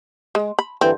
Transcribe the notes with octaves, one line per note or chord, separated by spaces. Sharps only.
G#3
B5
G2 D3 E3 C4